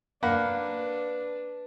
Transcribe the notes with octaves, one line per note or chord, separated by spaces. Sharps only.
A#3 D4 B4 F#5 B5